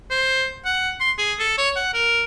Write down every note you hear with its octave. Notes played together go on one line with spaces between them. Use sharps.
C5
F#5
C6
G#4
A4
C#5
F#5
A#4